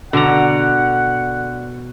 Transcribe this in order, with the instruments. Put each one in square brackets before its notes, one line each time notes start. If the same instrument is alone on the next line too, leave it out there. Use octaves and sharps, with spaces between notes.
[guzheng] B2 A#5 [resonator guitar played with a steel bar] D3 [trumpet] F#5